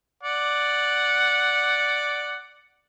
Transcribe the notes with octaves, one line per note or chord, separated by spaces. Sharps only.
D5 F#5